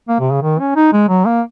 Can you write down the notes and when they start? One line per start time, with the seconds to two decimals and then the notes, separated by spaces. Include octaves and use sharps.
0.08 A#3
0.20 C3
0.31 C#3
0.42 D#3
0.59 C#4
0.76 D#4
0.93 G#3
1.09 F#3
1.26 A#3